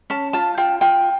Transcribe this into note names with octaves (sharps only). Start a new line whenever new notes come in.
C#4 A5
F4 A5
F4 G5
F4 G5